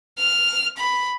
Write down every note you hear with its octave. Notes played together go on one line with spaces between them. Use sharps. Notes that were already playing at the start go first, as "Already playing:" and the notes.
F6
B5